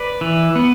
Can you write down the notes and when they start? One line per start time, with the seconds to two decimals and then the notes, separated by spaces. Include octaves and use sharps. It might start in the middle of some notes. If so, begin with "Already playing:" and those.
Already playing: B4 D5
0.21 E3
0.56 B3